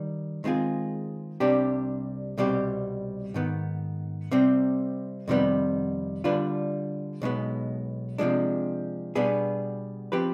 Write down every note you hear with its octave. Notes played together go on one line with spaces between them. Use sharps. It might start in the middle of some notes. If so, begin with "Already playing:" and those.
Already playing: D#3 G3
D#3 G#3 C4 F4 G#4
C2 C3 G3 D4 G4
C2 B2 G3 C4 G4
G#2 D#3 B3
C3 G3 C4
F2 C3 D#3 G3 B3
D3 G3 D4 F4 B4
B1 B2 G#3 B3
C3 F3 G#3 D4
B2 G3 B3 D4 G#4
F3 C4 G4 B4